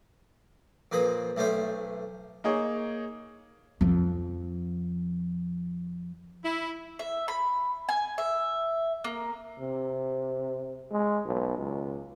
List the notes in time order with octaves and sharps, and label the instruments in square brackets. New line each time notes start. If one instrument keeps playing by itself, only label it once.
[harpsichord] F2 A#2 B4 C5 D#6
B1 A3 C#4 C5 E5
[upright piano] A#3 D#4 G#4 C#5
[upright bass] F2 F3
[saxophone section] E4
[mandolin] E5
B5
G#5
E5
A#3
[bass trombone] C3
G#3
B1
C#2